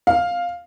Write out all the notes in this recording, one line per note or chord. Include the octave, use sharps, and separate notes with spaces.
F5